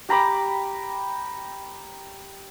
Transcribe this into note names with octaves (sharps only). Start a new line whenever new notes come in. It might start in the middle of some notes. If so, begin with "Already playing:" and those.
G4 A#5 B5 D6